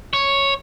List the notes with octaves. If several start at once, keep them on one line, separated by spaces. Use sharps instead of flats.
C#5